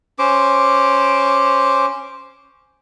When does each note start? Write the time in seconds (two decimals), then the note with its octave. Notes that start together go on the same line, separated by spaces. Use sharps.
0.19 C#4 C5 D6